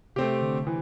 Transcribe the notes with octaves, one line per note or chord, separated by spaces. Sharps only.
C3 A3 C4 G4
D3
E3